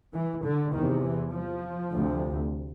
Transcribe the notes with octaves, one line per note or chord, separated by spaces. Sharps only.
E3
D3
E2 C3 D#3
E3
F3
D2 C3